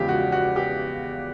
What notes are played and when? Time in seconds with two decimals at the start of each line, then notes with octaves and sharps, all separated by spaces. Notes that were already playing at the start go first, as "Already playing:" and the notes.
Already playing: E2 C#3 F3 G#3 G4
0.08 F#4
0.32 F#4
0.56 G4